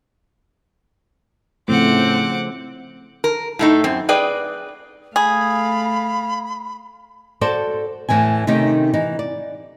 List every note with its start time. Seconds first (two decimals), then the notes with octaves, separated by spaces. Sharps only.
1.68 A2 C#3 F3 A3 C4 F#5 D6
3.24 A#4
3.59 A2 A3 D#4
3.84 F#2 C4
4.09 G#4 B4 D5 D#5 G5
5.16 A3 G#4 F5 B5
7.41 F#4 A4 C5 D5
8.09 E2 A2 E3 E4 G#5
8.47 C3 D#3 A3 C#4 D#4 G4
8.94 E3 D#4
9.19 D5